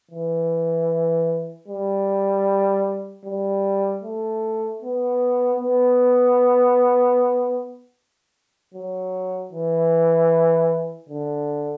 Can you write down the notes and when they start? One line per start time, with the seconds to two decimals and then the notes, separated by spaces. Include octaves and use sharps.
0.11 E3
1.68 G3
3.25 G3
4.04 A3
4.82 B3
5.60 B3
8.74 F#3
9.52 E3
11.09 D3